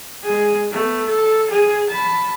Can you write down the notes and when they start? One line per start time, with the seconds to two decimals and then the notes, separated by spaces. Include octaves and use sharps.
0.23 G#3 G#4
0.72 A3 B3
1.06 A4
1.50 G#4
1.89 A5 B5